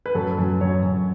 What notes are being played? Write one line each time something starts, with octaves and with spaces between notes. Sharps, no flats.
B4
F#2 A4
F#2
F#2 C#5
F#2